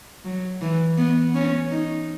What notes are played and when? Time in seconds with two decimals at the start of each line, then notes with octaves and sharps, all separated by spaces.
0.25 F#3
0.61 E3
0.98 B3
1.35 C#4
1.71 D#4